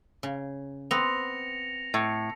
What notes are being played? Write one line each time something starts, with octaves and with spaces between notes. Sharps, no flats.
C#3
B3 C4 A#6 C#7 F7
A2